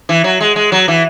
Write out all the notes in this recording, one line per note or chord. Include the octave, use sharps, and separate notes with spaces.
E3
F#3
G#3
G#3
F#3
E3